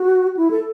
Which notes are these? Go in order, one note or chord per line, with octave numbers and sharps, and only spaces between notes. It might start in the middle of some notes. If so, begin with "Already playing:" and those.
Already playing: F#4
E4
A4